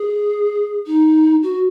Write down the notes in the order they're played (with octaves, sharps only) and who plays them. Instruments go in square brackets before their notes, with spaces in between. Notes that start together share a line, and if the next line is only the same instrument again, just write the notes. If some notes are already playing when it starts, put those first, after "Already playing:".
Already playing: [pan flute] G#4
D#4
F#4